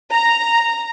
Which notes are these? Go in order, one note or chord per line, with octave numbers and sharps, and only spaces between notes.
A#5